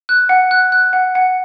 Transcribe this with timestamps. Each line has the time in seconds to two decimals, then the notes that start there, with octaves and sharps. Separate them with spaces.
0.09 F#6
0.29 F#5
0.51 F#6
0.72 F#6
0.93 F#5
1.15 F#5